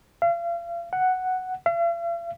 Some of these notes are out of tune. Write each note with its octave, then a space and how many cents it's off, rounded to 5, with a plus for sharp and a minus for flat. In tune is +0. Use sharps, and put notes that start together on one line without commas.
F5 -35
F#5 +0
F5 -45